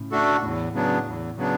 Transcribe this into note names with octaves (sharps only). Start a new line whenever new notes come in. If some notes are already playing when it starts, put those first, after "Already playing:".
Already playing: A2 C#3
A3 D4 F#4 A4
E2 A2
C#3 F#3 B3 D4
E2
C#3 F#3 B3 D4